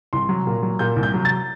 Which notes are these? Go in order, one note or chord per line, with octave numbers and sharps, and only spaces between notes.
C2 C6
F#3
A#2
F#3
A#2 G6
C2
G6
F#3
A6